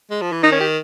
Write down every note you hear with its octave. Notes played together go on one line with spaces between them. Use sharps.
G#3
F3
E3
D#3 D#4
C#4
G4